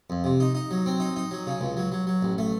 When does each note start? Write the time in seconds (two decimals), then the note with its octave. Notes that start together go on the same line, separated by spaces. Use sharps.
0.10 F2
0.24 C3
0.40 D#4
0.55 D#4
0.71 F#3
0.86 C4
1.00 D#4
1.16 D#4
1.31 F#3
1.47 C#3
1.61 C#2
1.77 F#3
1.92 F#3
2.07 F#3
2.22 A1
2.38 A3